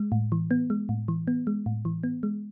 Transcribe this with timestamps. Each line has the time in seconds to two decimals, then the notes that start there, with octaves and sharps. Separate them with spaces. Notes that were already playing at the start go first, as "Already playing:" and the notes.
Already playing: G#3
0.12 A2
0.32 E3
0.51 B3
0.70 G#3
0.89 A2
1.08 E3
1.28 B3
1.47 G#3
1.66 A2
1.85 E3
2.03 B3
2.23 G#3